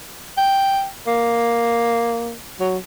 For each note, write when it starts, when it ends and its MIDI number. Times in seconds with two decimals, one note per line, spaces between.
0.37 0.87 79
1.07 2.36 58
2.60 2.78 54